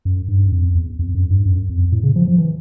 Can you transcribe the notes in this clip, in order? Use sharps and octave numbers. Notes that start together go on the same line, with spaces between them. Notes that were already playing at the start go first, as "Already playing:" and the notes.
F#2
G2
F#2
F2
E2
F2
F#2
G2
F#2
F2
A2
C#3
F3
F3
E3